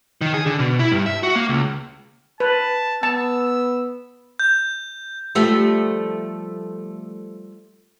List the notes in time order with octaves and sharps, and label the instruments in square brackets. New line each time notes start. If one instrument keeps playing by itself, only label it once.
[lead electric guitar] D#3
G#4
D3
B2
E4
G2
E5
F#4
A#3
C#2
[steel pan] B4 [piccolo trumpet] A5
[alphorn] B3 [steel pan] A5 [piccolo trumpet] E6
[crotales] G6
[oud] F3 G3 A3